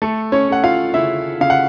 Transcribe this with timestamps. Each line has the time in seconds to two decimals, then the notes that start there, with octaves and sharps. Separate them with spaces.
0.02 A3 A4
0.32 C#4 C#5
0.49 A3 F#5
0.64 F4 F5
0.94 C#3 E4 E5
1.41 C#3 F5
1.50 F#5